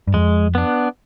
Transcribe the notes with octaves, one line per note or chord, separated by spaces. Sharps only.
G2
F2 G#3
B3 D4